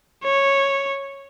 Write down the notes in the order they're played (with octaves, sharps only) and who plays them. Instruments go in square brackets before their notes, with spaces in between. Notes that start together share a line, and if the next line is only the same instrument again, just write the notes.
[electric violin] C#5